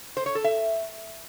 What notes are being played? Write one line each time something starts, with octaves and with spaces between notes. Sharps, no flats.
C5
C#5
A4
E5